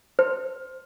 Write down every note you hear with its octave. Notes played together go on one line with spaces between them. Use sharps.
C5